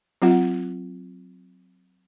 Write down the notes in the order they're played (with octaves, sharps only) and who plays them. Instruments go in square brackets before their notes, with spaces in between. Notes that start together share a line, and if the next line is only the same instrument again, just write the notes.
[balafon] F#3 C4 F4 F#5